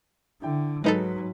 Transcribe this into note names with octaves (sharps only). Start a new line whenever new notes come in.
D3 E4 G5
G#2 F#3 G#3 D#4 A4 B4 B6